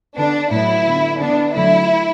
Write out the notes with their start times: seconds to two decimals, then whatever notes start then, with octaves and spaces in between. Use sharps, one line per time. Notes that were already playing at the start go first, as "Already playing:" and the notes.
0.17 D3 B3 D4
0.51 A2 F#3 B3 E4
0.85 D3 B3
1.20 D3 B3 D4
1.54 D3 F#3 A3 E4